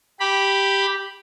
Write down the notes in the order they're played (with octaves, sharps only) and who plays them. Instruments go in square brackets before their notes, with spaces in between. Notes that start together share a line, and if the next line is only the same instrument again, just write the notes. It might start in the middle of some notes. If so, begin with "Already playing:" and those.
[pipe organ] G4 B5